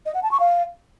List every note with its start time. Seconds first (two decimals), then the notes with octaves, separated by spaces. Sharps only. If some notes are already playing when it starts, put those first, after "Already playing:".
0.06 D#5
0.14 F#5
0.23 A5
0.31 C#6
0.40 F5